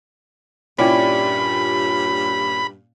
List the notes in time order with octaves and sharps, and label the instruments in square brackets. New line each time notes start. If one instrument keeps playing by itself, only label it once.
[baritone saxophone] G2 [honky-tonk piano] A#2 C#4 [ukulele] E4 G4 D5 [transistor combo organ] B5